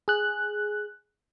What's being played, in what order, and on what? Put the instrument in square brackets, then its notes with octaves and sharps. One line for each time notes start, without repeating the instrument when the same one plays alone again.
[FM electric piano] G#4 F#6